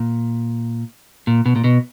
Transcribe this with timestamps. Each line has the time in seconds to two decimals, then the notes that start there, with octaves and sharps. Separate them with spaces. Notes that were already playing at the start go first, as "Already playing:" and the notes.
Already playing: A#2
1.27 A#2
1.46 B2
1.56 A#2
1.64 B2